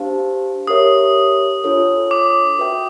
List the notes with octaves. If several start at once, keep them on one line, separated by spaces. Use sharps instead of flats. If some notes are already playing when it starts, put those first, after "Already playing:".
Already playing: D4 G4 C5 F5 A5
G4 A#4 C#5 E5 D#6
D4 F4 A4 C#5
D6
F#4 B4 E5 G5